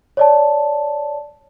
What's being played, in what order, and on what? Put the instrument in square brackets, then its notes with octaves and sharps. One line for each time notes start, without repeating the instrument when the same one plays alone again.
[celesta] C#5 D5 A5